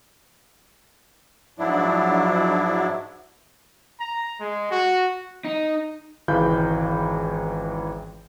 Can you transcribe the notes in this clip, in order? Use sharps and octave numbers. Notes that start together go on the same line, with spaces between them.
G#2 F3 F#3 D4 E4
A#5
G#3
F#4
D#4
G#1 C#2 E3 F5 B5 G6